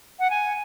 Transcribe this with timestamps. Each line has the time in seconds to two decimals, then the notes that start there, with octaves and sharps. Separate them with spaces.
0.19 F#5
0.30 G#5